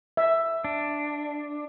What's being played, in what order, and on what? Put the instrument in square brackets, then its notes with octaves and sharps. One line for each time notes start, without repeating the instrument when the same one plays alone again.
[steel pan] E5
[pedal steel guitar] D4